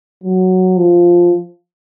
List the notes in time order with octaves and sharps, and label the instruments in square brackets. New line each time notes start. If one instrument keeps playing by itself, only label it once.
[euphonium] F#3
F3